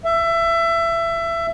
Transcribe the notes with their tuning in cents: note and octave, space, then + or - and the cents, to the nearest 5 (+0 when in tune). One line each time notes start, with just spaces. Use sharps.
E5 +20